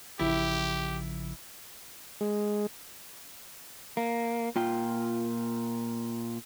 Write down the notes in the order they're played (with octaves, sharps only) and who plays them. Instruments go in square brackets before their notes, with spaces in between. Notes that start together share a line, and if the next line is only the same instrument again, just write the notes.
[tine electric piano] A1 C#3 F3 [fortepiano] E4 [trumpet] G4
[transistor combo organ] G#3
[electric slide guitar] A#3
A#2 F4 G5